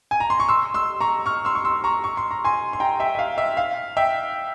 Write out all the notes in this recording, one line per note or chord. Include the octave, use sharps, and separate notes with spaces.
G#5
A#5
C6
C#6
C6 E6
C6 E6
A#5 C#6
C#6 F6
C6 E6
C#6
C6 E6
A#5 C#6
C#6
C6
A#5
G#5 C6
C6
G5 A#5
E5 G5
E5
F5
E5
F5
E5 G5